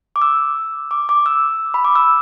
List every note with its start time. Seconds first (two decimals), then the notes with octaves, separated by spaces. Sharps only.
0.16 D6
0.22 E6
0.91 D6
1.09 D6
1.26 E6
1.74 B5
1.85 D6
1.96 E6